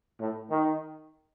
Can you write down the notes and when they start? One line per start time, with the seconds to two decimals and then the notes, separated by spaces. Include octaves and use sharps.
0.20 A2
0.51 D#3